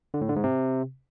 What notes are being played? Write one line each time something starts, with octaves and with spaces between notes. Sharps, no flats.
D3
A2
D3
G#2
C3